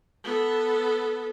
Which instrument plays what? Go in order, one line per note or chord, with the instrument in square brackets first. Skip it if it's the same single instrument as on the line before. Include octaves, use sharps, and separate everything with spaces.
[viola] B3 A4